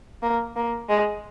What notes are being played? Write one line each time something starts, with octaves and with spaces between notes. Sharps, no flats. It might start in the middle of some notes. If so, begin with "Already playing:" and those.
A#3
A#3
G#3